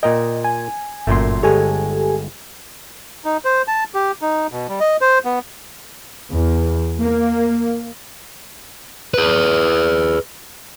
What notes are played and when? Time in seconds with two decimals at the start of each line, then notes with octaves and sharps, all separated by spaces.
0.03 A#2 A#4 D#5 G5
0.44 G#5
1.07 G1 F#2 A#2 A3 C6
1.43 G1 G#3 G4 A4 C#5 G#5
3.25 D#4
3.45 C5
3.68 A5
3.94 G4
4.22 D#4
4.52 B2
4.69 G3
4.80 D#5
5.01 C5
5.25 B3
6.31 E2
7.00 A#3
9.14 G#4 B4